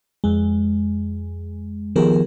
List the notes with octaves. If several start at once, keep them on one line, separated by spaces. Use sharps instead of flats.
F2 G#3
D#3 F3 B3 G4 G#4 A#4